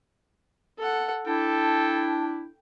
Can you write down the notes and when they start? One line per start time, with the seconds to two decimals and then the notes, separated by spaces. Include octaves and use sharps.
0.78 A4 F#5
1.27 D4 E4 A4 G5 A5